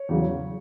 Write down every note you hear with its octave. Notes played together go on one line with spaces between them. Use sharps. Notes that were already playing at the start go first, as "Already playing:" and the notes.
Already playing: C#5
E2 C#3 F#3